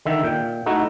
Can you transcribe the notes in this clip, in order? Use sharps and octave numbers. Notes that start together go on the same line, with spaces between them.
D3 D#3 E5
A#2 G5
A3 D#4 E4 F#4